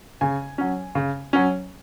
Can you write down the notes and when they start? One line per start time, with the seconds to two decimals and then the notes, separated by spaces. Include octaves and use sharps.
0.21 C#3 G#5
0.58 F#3 C#4
0.95 C#3
1.33 F#3 C#4